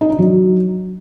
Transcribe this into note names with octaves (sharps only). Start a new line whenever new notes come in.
D#4
D4
F#3